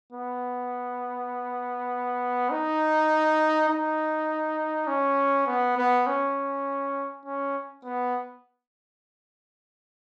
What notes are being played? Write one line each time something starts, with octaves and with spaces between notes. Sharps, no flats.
B3
D#4
D#4
C#4
B3
B3
C#4
C#4
B3